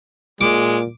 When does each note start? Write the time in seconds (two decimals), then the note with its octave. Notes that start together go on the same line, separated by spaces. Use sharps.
0.41 A#2 G#3 D6